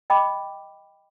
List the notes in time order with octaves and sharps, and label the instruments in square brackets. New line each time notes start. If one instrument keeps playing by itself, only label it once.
[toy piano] D#5 G5 B5 C#6 D6